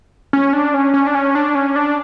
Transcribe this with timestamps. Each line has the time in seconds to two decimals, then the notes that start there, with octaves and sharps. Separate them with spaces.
0.33 C#4
0.53 D4
0.74 C#4
0.94 C#4
1.06 D4
1.15 C#4
1.35 D4
1.55 C#4
1.76 D4